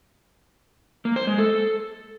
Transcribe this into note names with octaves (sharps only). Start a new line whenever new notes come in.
A#3
C5
G#3
A4